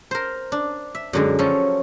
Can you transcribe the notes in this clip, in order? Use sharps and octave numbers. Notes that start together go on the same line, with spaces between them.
A#4 C5
D4
E5
F#2 D3 G#3
F3 F#3 C#4 A4